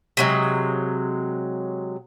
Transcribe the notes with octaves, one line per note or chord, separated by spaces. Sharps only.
C3 F#3 G#3